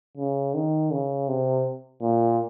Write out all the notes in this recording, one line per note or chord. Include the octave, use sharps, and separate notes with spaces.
C#3
D#3
C#3
C3
A#2